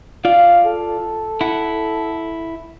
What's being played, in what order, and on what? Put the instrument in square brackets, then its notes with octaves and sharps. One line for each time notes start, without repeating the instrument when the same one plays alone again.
[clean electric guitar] F4 D5 [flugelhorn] F5
[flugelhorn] A4
[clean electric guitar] E4 F#5